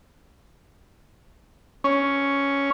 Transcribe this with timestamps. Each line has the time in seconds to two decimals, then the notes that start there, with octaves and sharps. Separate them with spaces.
1.84 C#4